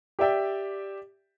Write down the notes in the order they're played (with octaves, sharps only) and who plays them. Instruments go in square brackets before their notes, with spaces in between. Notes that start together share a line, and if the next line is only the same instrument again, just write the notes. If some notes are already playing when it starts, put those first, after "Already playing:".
[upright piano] G4 D5 E5 G5